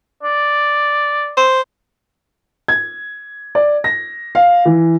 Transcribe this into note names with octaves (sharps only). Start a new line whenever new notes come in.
D5
C5
G#6
D5
A#6
F5
E3